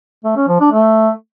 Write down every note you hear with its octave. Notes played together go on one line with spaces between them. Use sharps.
A3
C#4
F3
D4
A3